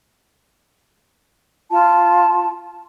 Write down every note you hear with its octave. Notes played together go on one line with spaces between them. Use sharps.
F4 A5